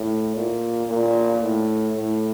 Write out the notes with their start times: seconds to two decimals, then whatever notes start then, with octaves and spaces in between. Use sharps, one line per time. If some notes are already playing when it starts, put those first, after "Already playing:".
Already playing: A2
0.36 A#2
0.89 A#2
1.42 A2
1.96 A2